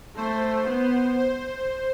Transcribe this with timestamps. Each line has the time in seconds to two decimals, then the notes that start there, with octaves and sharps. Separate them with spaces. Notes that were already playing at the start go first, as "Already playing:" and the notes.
0.17 A3 C5
0.68 B3
1.18 C5